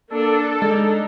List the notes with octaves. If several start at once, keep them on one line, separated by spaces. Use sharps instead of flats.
A#3 D4 A4
G#3 D4 D#4